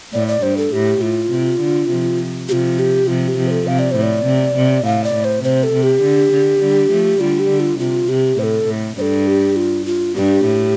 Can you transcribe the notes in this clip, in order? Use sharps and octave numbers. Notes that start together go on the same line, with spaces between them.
A2 D5
D5
G2 C5
A4
A2 G4
A2 F4
C3
D3
C3 F3
C3 F3 F4 G4
G4
C3 F3 F4
G4
C3 F3
C5
A4
C3 F5
D5
A2 C5
D5
C3
C3
A2 F5
D5
A2
C5
C3 C5
A4
C3
G4
D3
D3
D3 G3
F3 A3
D3 G3 F4
G4
D3
F4
C3 F4
C3 G4
A2 C5
A4
A2
G2 A4 C5
G4
F4
F4
G2 G4
A2